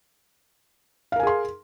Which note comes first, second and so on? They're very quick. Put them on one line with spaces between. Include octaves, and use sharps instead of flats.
F5 A#4 G#5 G#4 C6